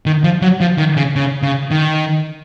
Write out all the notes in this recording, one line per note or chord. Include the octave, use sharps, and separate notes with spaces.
D#3
F3
F#3
F3
D#3
C#3
C#3
C#3
D#3